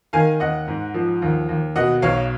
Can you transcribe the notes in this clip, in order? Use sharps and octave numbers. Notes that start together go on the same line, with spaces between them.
D#3 F5 G#5
D#2 D#5 F#5
G#2
F3
D#2
D#2
B2 D#5 F#5
B1 C#5 F5